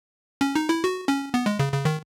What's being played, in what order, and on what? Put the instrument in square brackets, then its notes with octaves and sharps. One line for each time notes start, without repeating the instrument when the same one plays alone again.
[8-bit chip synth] C#4
D#4
E4
F#4
C#4
B3
G#3
C#3
C#3
D#3